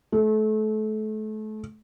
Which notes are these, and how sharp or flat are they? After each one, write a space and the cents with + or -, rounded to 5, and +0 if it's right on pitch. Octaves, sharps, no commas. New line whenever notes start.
A3 -30